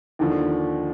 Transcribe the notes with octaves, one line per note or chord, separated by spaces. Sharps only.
D#2 D3 F3